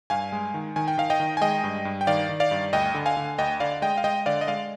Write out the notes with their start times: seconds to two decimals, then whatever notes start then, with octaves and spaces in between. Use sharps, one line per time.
0.10 G2 F5 G#5
0.32 G#3
0.54 D#3
0.76 D#3 G#5
0.88 G5
0.98 D#3 F5
1.10 D#5 G5
1.20 D#3
1.37 G#5
1.41 G#3 D#5 G5
1.64 G2
1.85 G2
2.01 G5
2.07 D#3 D5 F5
2.29 D#3
2.40 D5 F5
2.51 G2
2.73 D2 D#5 G5
2.95 D3
3.06 F5 G#5
3.17 D3
3.38 D2 D#5 G5
3.60 D3 D5 F5
3.82 G#3 D#5 G5
3.98 F5
4.04 G#3 D#5 G5
4.26 D3 D5 F5
4.41 D#5
4.48 G#3 D5 F5